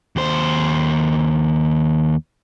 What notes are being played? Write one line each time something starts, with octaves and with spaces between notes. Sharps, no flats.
D#2 C5